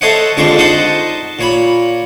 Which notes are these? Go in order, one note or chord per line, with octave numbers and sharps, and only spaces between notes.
A4 C5 C#5 D#5 E5 F#5
F2 D3 G#3 D4 C5 C#6
D#4 F#4 C5 D#5 F#5 A5
A#2 C#5 B5